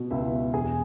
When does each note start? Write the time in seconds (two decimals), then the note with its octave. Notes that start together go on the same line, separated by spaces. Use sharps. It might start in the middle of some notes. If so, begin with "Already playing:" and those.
Already playing: B2 F#4
0.11 C#2 E4 E5
0.32 B2
0.53 E1 G#4 G#5